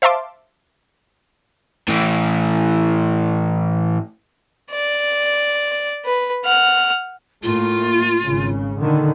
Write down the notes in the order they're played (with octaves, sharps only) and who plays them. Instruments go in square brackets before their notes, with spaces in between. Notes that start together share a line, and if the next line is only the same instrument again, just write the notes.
[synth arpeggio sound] C5 E5 F5 A5 C6 D6
[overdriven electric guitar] A2 E3
[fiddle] D5
B4
F#5 F6
[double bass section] A2 A3 A#3 [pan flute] F4
[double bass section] G#1 C#3
A#2 D3 D#3